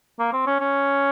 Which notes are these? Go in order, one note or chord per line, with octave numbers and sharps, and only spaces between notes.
A#3
C4
C#4
C#4